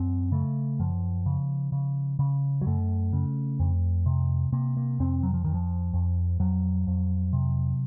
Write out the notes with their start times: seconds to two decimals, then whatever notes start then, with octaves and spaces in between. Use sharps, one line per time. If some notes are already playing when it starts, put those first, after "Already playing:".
Already playing: F#2 C4
0.32 C#3 A3
0.79 F#2 F3
1.26 C#3
1.72 C#3
2.19 C#3
2.61 F#3
2.67 F#2 A3
3.13 C#3
3.60 F2
4.06 C3
4.52 C3 A#3
4.77 A#3
4.99 F2 C4
5.23 F#3
5.34 F3
5.44 F2 D#3
5.54 F3
5.93 F2
6.40 F2 F#3
6.87 F2
7.33 C3